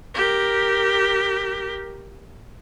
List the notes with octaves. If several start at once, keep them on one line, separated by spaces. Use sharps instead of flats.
G4 A#4